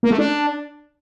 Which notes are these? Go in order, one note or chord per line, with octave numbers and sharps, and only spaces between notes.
A#3
A3
D4